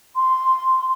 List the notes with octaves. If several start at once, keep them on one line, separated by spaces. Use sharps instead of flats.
C6